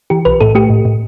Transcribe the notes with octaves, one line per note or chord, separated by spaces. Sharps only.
E3 G4
B1 B4
A2 A4
A3 G4
A2
A2